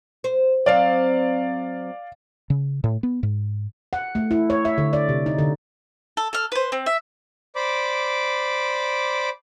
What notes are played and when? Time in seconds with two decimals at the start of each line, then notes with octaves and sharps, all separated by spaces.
0.24 C5
0.66 F#3 C4 D5 F5
2.50 C#3
2.84 A2
3.03 B3
3.23 G#2
3.93 F#5
4.15 A3
4.31 E4
4.50 C#5
4.65 E5
4.78 D3
4.93 D5
5.09 C3
5.26 D#4
5.38 D3
6.17 A4
6.33 A4 F6
6.52 B4 C5
6.72 C4
6.86 E5
7.56 C5 D5 B5 D6